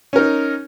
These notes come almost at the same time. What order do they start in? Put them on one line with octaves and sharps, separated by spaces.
C#4 A#4 D#4